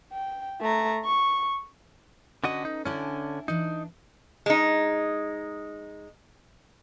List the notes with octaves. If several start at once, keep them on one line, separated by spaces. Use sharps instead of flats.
G5
A3 A#5
C#6
D3 C#4 F#4 A4 B4 D#5
D#4
D3 C#4 D4 E4 G#5
E3 D4 D#4
G#3 D#4